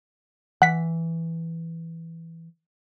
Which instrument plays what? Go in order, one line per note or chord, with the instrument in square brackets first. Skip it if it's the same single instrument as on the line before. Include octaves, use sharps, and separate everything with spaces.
[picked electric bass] E3 [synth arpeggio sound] F#5 B6